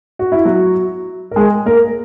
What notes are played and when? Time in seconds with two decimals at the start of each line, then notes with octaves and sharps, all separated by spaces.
0.19 F#4
0.32 E4
0.45 F#3 F#4
1.31 A#4
1.36 G#3 G#4
1.66 A#3 A#4